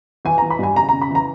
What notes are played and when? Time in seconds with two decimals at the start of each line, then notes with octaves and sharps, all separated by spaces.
0.25 E3 G#5
0.38 A#5
0.42 E3
0.50 B5
0.59 G2 G#5
0.76 C#3 A#5
0.89 C#3 A#5
1.02 B5
1.10 E3 A#5